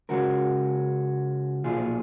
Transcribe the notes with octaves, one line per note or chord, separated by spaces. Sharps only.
C#2 C#3 G#3 C#4 F#4 A#4
B1 A#2 F3 F4 G#4